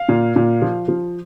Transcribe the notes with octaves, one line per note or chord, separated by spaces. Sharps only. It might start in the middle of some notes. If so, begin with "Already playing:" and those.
Already playing: F5
A#2
A#2
F3
F3